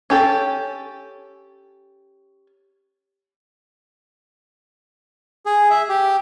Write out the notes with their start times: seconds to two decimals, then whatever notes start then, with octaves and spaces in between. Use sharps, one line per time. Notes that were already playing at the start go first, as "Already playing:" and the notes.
0.10 C#4 G4 A4
5.46 G#4
5.71 E5
5.89 G4